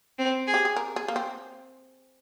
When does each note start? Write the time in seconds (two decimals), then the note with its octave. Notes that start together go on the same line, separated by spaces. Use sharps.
0.18 C4
0.47 G#4
0.54 G4
0.65 G#4
0.76 A#4
0.96 G#4
1.08 A#3
1.16 C4